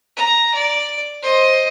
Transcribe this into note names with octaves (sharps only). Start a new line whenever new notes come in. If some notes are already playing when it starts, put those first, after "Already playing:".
A#5
D5
C5 D#5